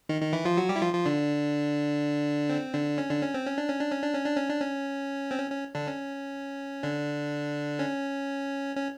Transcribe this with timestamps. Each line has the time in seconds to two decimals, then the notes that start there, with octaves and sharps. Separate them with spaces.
0.09 D#3 D#4
0.21 D#3 D#4
0.33 E3 E4
0.45 F3 F4
0.57 F#3 F#4
0.69 G3 G4
0.76 E4
0.81 F3 F4
0.93 F3 F4
1.06 D3 D4
2.50 C4
2.74 D3 D4
2.98 C#4
3.10 D3 D4
3.22 C#4
3.34 C4
3.47 C#4
3.58 D4
3.69 C#4
3.80 D4
3.92 C#4
4.03 D4
4.15 C#4
4.26 D4
4.37 C#4
4.49 D4
4.60 C#4
5.31 C4
5.38 C#4
5.51 C#4
5.75 D3 D4
5.87 C#4
6.83 D3 D4
7.79 C#4
8.76 C#4